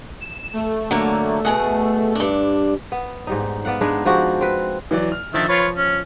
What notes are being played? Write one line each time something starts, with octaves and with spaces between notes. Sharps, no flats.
E7
A3
D3 F#3 A#3
B2 G#4 F#5
G2 D4
B3
G#2 G3 D#4
B3 D5 F5 F#5
G#3 D4 D#4 B4
F3 G#3 F#4 G4
C4 B4
E3 F#3 D5
F6
D3 D#3 F3 E5 A6
F4 B4 C#5
C#4